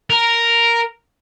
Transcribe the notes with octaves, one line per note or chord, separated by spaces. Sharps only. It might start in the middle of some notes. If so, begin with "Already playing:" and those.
A#4